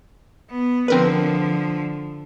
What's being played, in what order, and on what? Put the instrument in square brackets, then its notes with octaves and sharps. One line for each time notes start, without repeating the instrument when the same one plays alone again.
[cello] B3
[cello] D3 F3 [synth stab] C4 A#4 B4